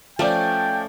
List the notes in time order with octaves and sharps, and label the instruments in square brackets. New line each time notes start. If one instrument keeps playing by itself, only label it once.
[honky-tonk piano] F3 D5 [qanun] A3 C#4 [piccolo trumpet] G5